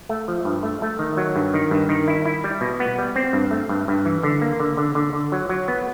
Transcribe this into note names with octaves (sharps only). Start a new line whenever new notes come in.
A3
F3
G2
A3
A3
D#3
F#3
G2
D#3
G2
D#3
E4
E4
G3
B2
B3
G3
C4
G2
A3
G2
G2
E3
D3
A#3
D3
D3
D3
D3
F#3
F#3
B3